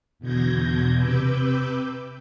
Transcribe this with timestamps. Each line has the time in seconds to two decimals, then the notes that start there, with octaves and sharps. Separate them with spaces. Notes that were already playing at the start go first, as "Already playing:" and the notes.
0.19 E2 B2 D3 G6 G#6 A#6
0.95 C3 B4 D6 E6 G6